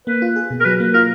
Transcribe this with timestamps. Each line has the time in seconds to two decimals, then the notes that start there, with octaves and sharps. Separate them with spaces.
0.07 A#3 B4
0.22 F4
0.36 G#4
0.50 B2
0.60 A#4
0.65 F#3 B4
0.80 A#3
0.93 F4 A#4